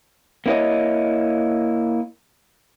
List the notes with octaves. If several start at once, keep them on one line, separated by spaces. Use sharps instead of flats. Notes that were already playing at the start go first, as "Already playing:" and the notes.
A#3 C4 E4 F#4 C#5 D#5